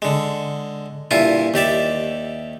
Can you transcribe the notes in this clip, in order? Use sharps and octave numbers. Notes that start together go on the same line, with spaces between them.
D3 G#3
G2 A#2 E4 F4 G#5
D#2 G4 D5 E5